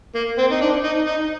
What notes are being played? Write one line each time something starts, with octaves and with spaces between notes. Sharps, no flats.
A#3
C4
D#4
D4
D#4
D#4